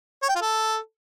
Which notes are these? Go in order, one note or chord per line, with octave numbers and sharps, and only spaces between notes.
C#5
G5
F4
A4